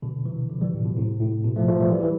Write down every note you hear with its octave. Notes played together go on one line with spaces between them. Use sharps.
B2 D3
C3 E3
D3 F3
E3 G3
A2
B2
A2 C3
A2
B2
F3 A3
F3 A3
E3 G3
E3 G3
E3